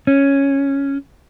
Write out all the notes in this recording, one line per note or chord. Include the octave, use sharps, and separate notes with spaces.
C#4